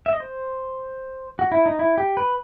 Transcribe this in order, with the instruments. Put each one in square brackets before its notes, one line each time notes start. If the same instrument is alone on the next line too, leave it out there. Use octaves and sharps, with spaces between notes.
[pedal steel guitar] E5
D#5
C5
F#4
E4
D#4
E4
G4
B4